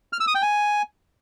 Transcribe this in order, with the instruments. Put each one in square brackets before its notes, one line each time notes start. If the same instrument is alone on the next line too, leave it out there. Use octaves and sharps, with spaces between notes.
[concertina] F6
E6
D#6
G5
G#5